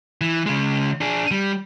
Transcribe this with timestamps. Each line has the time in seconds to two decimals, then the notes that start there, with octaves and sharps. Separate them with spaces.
0.21 E3
0.46 C#3 G#3
1.01 D4 G#4
1.31 G3